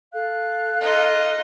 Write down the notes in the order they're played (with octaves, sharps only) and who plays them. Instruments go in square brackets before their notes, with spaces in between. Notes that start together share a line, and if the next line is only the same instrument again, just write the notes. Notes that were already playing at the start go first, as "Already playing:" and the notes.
[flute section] A4 F5 F#6
[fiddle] D#4 F4